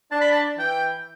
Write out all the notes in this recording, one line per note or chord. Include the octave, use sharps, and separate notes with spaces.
D4 A5
B5
A5
E3 G5